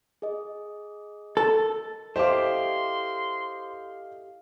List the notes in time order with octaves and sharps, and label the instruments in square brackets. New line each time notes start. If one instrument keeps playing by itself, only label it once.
[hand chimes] G#4 D#5
[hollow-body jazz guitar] A4 [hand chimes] A#4
[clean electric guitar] E4 G4 A4 [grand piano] C5 D6 [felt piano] D#5 F5 [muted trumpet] C6